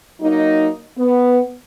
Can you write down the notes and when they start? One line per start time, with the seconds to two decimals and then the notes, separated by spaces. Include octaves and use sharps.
0.21 F#3 A#3 D#4
0.97 B3